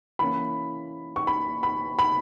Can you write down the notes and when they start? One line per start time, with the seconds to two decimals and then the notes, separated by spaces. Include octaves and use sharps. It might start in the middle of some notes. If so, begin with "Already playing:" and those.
0.19 E3 A#3 C#4 E4 B5
1.16 C#6
1.27 B5
1.63 B5
1.99 B5